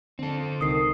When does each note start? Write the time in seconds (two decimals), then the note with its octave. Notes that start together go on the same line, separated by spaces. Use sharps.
0.19 D3 C4 A4
0.61 C2 D#3 D#6 C7